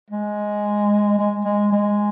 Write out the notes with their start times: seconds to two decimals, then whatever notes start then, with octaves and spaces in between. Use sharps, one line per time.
0.11 G#3
1.18 G#3
1.45 G#3
1.72 G#3